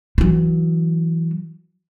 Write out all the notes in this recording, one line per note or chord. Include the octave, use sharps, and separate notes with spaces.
E3 F#3